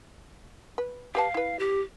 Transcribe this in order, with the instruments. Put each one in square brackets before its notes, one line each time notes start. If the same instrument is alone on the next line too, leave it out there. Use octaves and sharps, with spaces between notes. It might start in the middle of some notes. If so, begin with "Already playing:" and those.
[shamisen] B4
[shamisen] G4 B4 A5 [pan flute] F5
[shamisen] E4 B4
[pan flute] G4